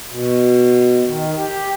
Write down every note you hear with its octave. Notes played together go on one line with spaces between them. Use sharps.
B2
D#3
G4